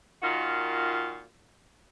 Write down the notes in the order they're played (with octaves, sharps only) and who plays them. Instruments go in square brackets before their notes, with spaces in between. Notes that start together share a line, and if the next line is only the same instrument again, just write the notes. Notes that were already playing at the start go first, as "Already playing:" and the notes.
[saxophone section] A#2 D#3 F4 F#4